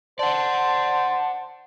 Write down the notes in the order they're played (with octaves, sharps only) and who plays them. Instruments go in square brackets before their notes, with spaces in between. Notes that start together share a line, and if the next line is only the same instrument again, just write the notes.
[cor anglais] C5 [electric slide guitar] D5 F#5 [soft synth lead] A5